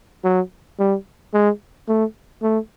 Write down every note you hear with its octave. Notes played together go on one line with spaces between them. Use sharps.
F#3
G3
G#3
A3
A3